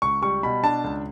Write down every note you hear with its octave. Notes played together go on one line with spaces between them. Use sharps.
C#2 C#6
G3 C#6
B2 B5
D4 A5
C#2